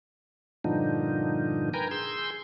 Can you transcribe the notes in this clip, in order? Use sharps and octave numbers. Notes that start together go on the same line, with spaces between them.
G2 A#2 D3 F3 D#4
A#4 B4 G5 G#5 A#5
G#4 C6 E6 G6